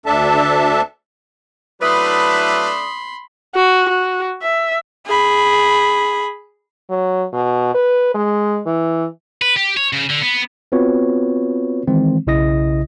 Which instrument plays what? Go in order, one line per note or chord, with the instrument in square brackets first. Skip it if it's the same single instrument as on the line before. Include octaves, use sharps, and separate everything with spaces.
[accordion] D2 D4 A4 E5 A5
[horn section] F#3 E4 B4 [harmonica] A3 D4 [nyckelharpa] B5 C6 [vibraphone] D#6
[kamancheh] F#4
F#4
E5
G#4 B5
[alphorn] F#3
B2
B4
G#3
E3
[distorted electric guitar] B4
G4
C#5
C#3
D3
B3
[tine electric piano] B3 C4 F4 F#4 B4 C#5
D#3 E3 G#3 C4
B1 C#3 E4 D#5 D#6 A#6